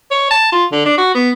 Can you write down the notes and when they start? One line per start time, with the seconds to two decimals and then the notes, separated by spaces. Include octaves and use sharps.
0.11 C#5
0.31 A5
0.52 F4
0.72 D3
0.86 D4
0.98 F#4
1.15 B3